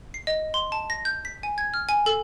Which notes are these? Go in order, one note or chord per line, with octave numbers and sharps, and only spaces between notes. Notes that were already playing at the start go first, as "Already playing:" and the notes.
C7
D#5
C6
A5
A#6
G6
B6
G#5
G#6
F6
G#5
A4